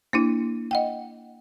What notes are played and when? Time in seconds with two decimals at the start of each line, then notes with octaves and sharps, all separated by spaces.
0.13 A#3 D4 E4
0.71 D#5 F#5 G5